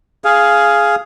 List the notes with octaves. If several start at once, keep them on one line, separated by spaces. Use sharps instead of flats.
G#4 F5